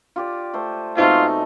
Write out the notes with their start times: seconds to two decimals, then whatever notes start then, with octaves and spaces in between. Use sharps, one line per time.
0.16 F4 G4 D5
0.53 A3 C5
0.97 B2 G#3 A3 C4 D#4 F4